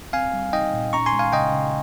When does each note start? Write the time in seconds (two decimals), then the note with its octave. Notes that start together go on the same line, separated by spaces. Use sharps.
0.13 C4 F5 G#5
0.34 G3
0.53 D#4 D#5 G5
0.74 A#2
0.93 C#4 A#5 C#6
1.06 G#5 C6
1.12 G#3
1.19 F5 G#5
1.33 C#3 D#5 G5
1.53 C#3